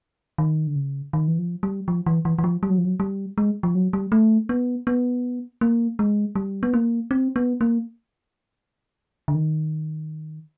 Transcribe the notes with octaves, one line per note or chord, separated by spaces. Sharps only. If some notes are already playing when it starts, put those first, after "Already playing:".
D#3
D3
C#3
D#3
E3
F3
G3
F3
E3
E3
E3
F3
G3
F#3
F3
F#3
G3
G#3
F3
F#3
G3
A3
B3
B3
A#3
G#3
G3
B3
A#3
C4
B3
A#3
D3
D#3